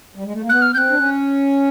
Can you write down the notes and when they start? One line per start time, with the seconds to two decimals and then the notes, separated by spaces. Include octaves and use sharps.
0.15 G3
0.24 G#3
0.33 A3
0.41 A#3
0.49 B3 F#6
0.62 F6
0.74 C4 G6
0.78 F#6
0.90 D4
0.98 C#4